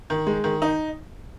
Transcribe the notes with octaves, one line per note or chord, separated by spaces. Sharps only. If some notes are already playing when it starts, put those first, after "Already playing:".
D#3
G#3
D#3
D#4